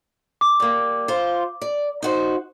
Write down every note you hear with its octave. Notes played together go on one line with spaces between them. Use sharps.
D6
G3 A#3
F4 C5
D5
D#4 F#4 C5